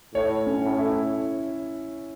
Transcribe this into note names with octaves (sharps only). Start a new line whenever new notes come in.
A2 C#5
C#4
A2
E4